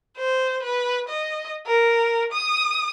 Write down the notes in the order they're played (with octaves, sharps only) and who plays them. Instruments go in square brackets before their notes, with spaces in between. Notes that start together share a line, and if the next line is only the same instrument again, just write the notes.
[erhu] C5
B4
D#5
A#4
D#6